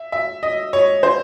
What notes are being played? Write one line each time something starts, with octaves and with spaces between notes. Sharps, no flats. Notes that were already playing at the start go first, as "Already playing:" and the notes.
Already playing: E5
E5
D#5
C#5
C5